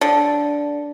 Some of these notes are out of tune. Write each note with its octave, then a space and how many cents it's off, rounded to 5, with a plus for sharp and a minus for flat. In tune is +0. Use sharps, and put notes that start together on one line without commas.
D3 -10